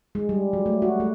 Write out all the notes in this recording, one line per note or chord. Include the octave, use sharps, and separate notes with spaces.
G#3
G3
F#3
A3
F#4
A3